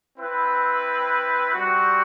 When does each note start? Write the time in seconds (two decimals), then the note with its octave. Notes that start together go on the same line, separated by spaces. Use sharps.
0.19 C4 E4 B4
1.54 G3 C4 F#4